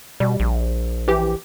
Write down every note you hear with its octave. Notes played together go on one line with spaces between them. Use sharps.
B2 G3
A#1
E3 G4